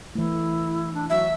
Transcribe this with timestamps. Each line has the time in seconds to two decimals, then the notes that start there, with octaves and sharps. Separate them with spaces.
0.15 E3 A3 E4
0.94 D4
1.10 F#3 E5